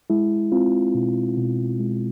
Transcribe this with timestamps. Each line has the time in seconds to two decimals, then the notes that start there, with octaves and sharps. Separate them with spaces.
0.10 G#3 E4
0.52 C4 F4
0.95 B2
1.37 B2
1.79 G#3